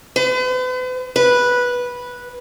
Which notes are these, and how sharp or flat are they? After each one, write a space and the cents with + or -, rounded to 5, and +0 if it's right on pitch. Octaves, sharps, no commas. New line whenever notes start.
B4 +45
B4 -10